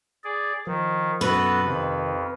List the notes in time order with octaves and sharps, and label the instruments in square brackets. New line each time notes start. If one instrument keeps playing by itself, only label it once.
[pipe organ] G#4 D5
[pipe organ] D#3 [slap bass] F3
[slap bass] F#2 B2 [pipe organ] B3 F#4 A4 [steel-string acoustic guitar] B4
[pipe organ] F2 [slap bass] C3 D#3